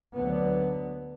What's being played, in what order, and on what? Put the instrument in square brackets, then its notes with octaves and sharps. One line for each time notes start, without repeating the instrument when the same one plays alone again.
[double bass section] D2 D3 F#3 B3